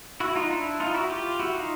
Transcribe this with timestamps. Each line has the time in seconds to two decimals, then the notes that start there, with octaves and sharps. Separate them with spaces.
0.20 E4 F#4
0.36 D#4 F4
0.50 D4 E4
0.80 D#4 F4
0.94 E4 F#4
1.10 F4 G4
1.39 E4 F#4
1.54 D#4 F4